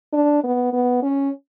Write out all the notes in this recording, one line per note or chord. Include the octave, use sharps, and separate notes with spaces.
D4
B3
B3
C#4